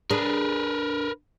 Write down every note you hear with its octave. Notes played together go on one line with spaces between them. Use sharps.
D4 G#4 A#4 B4